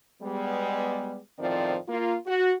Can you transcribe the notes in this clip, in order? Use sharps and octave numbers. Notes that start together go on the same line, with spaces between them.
G3 G#3 B3
E2 A2 D#3 F3 C4 D5
A#3 F4
F#4